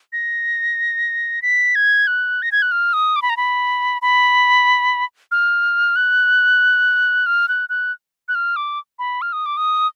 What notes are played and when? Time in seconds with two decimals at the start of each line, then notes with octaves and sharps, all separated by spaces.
0.13 A#6
1.42 B6
1.75 G#6
2.07 F#6
2.42 A#6
2.52 G#6
2.62 F#6
2.71 F6
2.93 D#6
3.16 D6
3.22 B5
3.30 A#5
3.37 B5
4.02 B5
5.31 F6
5.96 F#6
7.26 F6
7.48 F#6
7.69 F#6
8.28 F#6
8.35 F6
8.56 D6
8.99 B5
9.22 F6
9.33 D#6
9.46 D6
9.57 D#6